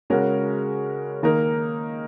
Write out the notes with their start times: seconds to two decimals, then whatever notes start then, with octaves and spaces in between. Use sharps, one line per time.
0.10 C#3 G#3 C#4 F#4 A#4
1.23 D#3 A#3 D#4 A#4